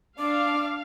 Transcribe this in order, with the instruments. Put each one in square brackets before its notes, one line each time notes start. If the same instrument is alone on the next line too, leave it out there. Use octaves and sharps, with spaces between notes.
[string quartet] D4 [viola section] F5 [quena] D6